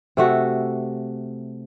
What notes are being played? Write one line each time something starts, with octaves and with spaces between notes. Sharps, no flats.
C3 A3 F#4